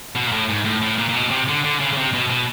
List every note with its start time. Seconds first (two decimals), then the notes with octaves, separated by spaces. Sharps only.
0.15 B2
0.27 A#2
0.32 A2
0.49 G#2
0.65 A2
0.82 A2
0.98 A#2
1.09 A#2
1.15 B2
1.31 C3
1.48 D3
1.64 D3
1.80 C#3
1.93 C#3
1.97 C3
2.13 B2
2.30 B2